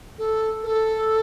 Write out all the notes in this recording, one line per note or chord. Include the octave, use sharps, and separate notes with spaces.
A4
A#4
A4